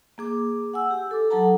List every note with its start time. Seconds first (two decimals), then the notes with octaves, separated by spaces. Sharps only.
0.18 A#3 G#4 D6
0.74 F#5 G#5 E6
0.91 G4
1.11 A4 D6
1.30 F#3 D#4 A4 F#5 A5 A#5